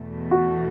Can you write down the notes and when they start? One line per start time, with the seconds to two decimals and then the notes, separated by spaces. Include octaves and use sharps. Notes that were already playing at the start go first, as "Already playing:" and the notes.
Already playing: E2 B2 A3
0.31 F#4